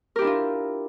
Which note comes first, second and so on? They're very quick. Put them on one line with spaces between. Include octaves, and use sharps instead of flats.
A#4 G4 E4 D4 F4